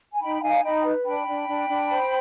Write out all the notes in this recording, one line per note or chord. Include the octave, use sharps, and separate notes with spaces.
G#5
D#4 G5 B5
D#4 F5 G#5
D#4 G5 B5
B4
D4 G5 B5
D4
D4
D4
C5